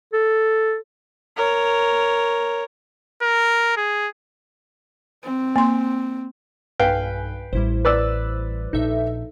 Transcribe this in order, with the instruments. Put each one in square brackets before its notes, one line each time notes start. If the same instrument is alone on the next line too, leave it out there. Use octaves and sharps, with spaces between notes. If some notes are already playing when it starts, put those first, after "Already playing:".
[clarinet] A4
[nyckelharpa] A#4 C#5
[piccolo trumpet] A#4
G#4
[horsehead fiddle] C4
[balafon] A#3 C6
[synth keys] B1 G2 G#5 [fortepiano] B4 F5 G5
[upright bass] A1 [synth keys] G3 E4 C5
[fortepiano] B4 D5 E6
[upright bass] A#1 [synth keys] D#4 A4 E5